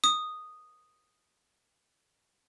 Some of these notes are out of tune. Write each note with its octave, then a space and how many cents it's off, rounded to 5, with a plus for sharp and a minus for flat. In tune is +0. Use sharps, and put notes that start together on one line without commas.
D#6 -5